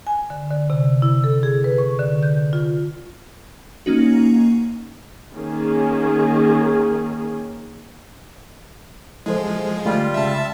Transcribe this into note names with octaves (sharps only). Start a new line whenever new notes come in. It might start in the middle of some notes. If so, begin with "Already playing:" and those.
G#5
D3
D3
C3
E4
A4
G#4
B4
C#6
D3
G6
F4
A#3 C#4 D#4 F#4
D#3 A#3 C#4 G#4
F3 G#3 E4 A4 C5
D3 G3 A3 F4
C#3 G#3 E5 A5